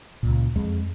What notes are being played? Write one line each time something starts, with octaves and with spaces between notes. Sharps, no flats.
C#2 A#2
F2 G#3